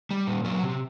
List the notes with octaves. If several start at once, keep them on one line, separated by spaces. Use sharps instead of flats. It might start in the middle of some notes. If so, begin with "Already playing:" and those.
G3
A#2
F#3
C3